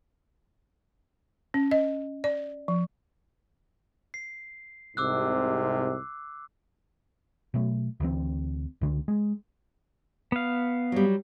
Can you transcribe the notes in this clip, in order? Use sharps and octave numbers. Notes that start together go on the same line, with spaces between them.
C#4
D#5
D5
F3
C7
C2 G#2 C3 D6 E6 F#6
B2 F#3 A3
D2 C#3 E3 C4
C#2 D3
G#3
B3 F5
F#3 G3